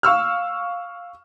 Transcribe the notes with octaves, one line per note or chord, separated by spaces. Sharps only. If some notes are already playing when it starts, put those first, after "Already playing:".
F5 C#6 E6 F6